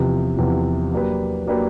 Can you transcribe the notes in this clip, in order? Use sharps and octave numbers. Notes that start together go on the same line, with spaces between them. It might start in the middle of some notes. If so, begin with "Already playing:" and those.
Already playing: E2 C3 F3
E2 C3 F3
F#3 A#3 D4 G4 B4
F#3 A#3 D4 G4 B4